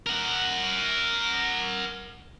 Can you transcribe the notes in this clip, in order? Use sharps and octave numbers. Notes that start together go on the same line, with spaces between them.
A#4 F#5